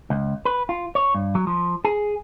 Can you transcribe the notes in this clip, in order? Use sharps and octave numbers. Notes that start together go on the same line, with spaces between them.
C#2
B4
F4
C#5
G2
F#3
F3
G#4